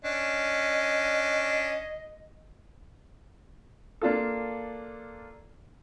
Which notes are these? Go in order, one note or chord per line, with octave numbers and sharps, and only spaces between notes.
C#4 D4 D#5
A#3 D4 F4 A4